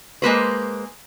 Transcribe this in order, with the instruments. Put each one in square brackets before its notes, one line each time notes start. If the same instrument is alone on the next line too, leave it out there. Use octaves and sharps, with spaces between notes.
[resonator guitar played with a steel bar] G#3 A#3 B4 C5